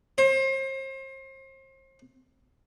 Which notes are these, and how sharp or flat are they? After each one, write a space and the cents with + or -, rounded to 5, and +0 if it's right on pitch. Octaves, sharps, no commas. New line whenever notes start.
C5 +35